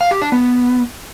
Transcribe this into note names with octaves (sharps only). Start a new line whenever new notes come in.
F5
G4
D4
B3